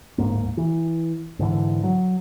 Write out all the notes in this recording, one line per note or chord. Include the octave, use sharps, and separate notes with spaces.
D1 G#2 A#3
E3
G#2 D3 E3
F#3